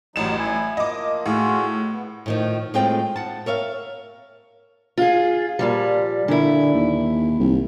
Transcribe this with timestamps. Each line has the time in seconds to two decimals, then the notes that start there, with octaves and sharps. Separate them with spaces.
0.16 A1 F#3 G3 D#4 E7
0.38 E4 G#5
0.77 F3 A#3 D#5 D6
1.26 A2 F4 F#4 G#4
1.92 B3
2.26 A2 D#3 F3
2.74 A2 G#3 C4 F4 G5
3.16 F#5 A5
3.46 A#4 C#5 E5 F5
4.98 F4 G#4
5.59 A#2 F3 G3
6.28 A#2 D3 E4
6.74 D#2
7.40 C2